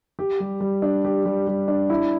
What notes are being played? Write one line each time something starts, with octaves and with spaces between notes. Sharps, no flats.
G4
G3
G3
D4
G4
G3
G3
D4
E4